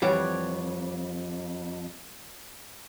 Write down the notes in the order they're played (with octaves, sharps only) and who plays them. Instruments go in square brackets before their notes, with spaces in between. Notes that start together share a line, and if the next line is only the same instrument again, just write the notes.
[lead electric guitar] F2 [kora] E3 G3 [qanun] C#5 F#5 D6